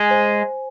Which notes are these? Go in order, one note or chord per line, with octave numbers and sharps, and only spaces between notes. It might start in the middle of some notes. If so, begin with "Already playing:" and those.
Already playing: G#3 G#4 G#5
C5